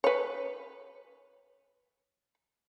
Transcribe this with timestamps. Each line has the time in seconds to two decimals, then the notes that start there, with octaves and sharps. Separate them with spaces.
0.04 B4 C#5